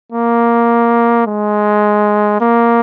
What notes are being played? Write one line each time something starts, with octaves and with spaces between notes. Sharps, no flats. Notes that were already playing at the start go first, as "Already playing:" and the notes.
A#3
G#3
A#3